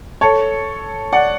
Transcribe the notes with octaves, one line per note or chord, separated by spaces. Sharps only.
A4 C#5
D5 F#5